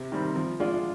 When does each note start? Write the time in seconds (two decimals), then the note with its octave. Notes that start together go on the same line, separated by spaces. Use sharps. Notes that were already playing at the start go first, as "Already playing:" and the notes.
Already playing: C3
0.12 D#3 G3 C4
0.36 F3
0.60 G#3 D4 F4